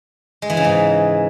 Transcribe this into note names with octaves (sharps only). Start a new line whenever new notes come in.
G#3
E3
C#3
G#2